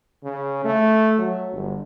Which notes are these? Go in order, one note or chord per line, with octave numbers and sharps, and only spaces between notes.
C#3
A3
F#3
G1